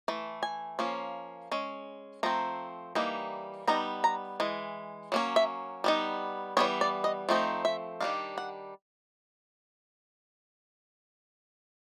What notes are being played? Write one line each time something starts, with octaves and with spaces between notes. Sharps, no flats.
E3 A3
G#5
F3 A#3 C#4
G#3 C#4
F3 A3 C4 A#5
E3 G3 A#3 D#4
G3 B3 D#4 A#5
A#5
E3 G#3
F#3 A#3 C#4
E5
G3 B3 D#4
E3 G3 B3 D4 C#5
D5
D#5
F3 A3 C4 D#4
E5
D#3 G3 A#3 D4 F5
F#5